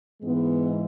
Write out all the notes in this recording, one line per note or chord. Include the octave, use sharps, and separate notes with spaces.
G#2 E3 G#3 B3